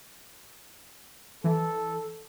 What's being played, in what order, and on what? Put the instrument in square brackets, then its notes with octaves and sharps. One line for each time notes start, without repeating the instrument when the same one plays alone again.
[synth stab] E3 [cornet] A4